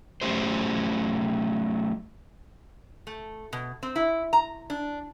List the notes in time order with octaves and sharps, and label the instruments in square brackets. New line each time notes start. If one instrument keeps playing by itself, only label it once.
[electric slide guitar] F#3 A3 C#4 G4 C5
[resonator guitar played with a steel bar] A3
B2
C4
E4
A#5
D4